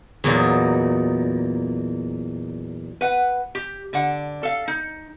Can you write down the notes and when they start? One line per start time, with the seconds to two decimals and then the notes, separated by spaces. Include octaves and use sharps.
0.24 E2 A#2 F#3 D#4
3.01 B4 F#5
3.55 G4
3.93 D3 D4 F#5
4.43 A4 F5
4.68 D#4